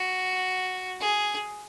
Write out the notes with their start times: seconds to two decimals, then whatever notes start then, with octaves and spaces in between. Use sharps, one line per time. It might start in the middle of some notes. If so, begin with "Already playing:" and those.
Already playing: F#4
1.00 G#4